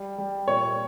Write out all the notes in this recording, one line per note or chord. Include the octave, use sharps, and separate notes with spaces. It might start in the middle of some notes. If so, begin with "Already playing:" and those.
Already playing: G3
G3
A#2 C#5